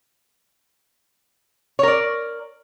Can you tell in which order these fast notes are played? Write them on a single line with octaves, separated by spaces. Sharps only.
C#5 A#4 D5